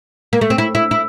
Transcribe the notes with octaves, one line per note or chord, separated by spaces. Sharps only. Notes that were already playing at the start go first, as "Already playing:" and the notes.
A#3
A3
C4
E4
E4
E4